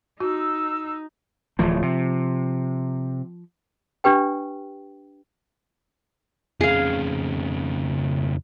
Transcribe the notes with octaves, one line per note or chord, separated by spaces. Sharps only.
D#4 F#4 E6
D1 E3 F3 A3
C3
D4 G4 B4 G5
F2 C#3 G#4 F5